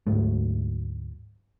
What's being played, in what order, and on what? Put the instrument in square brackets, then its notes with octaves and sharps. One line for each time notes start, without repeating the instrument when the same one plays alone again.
[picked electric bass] D2 G#2 F#3 A3